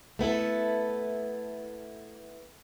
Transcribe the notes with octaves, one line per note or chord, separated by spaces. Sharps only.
A3 B3 E4 A4